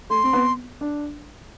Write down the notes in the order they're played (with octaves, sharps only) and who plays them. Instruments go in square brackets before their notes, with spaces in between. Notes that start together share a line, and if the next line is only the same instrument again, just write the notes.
[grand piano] A3 [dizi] C6
[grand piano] C4
B3
D4